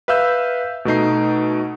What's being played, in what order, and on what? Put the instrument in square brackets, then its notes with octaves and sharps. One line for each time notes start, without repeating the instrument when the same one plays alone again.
[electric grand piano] B4 E5 F5 E6 G6
B2 A3 D#4 C7